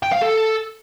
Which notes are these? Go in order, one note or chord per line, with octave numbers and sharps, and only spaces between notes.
G5
F5
A4